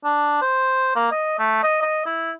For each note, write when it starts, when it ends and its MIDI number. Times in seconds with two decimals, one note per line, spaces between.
0.04 0.37 62
0.42 0.95 72
0.95 1.11 58
1.12 1.36 75
1.39 1.63 57
1.63 1.78 75
1.82 2.01 75
2.06 2.31 64